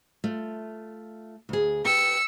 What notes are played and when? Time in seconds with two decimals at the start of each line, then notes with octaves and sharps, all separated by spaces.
0.24 A3 F4
1.49 D2 G#4
1.85 G4 B4 G5 E6 C#7